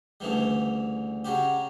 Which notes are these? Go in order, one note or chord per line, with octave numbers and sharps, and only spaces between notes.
D2 C#3 E3 G3
C#3 F#3 C#4 G4